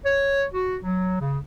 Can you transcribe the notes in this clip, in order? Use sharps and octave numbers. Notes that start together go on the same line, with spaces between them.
C#5
F#4
F#3
C#3